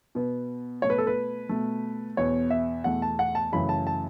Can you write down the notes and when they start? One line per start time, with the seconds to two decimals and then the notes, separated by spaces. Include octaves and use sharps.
0.15 B2 B3
0.82 B2 A3 C#5
0.90 B4
0.98 A4
1.07 B4
1.49 B2 A3
2.17 E2 B2 B3 C#5
2.50 E5
2.84 E2 B2 A3 F#5
3.02 A5
3.19 F#5
3.35 A5
3.53 F#2 C#3 E3 A3 B5
3.69 A5
3.87 A5